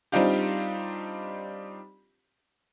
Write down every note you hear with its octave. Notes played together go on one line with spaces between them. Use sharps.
G3 C4 D4 D#4 F4 G4